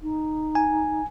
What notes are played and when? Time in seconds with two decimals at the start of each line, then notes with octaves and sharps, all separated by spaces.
0.02 D#4
0.55 G#5